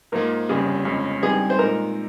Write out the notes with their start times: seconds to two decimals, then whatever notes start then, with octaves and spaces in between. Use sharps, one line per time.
0.12 G#2 F3 A#3 A#4
0.49 G1 F2 C#3 G3 C#4 G#4
0.85 G1 F2 C#3 G#3 C#4
1.22 G2 G3 C4 D#4 G#4
1.50 C5
1.58 A#2 G#3 D#4 A#4